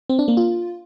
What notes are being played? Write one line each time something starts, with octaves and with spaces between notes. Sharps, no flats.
C4
D4
A#3
F4